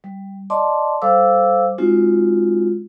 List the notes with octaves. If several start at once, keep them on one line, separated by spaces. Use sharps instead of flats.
G3
D5 D#5 A5 C6 D6
G3 A4 C5 F5 D6 E6
G#3 C4 D#4 F4 F#4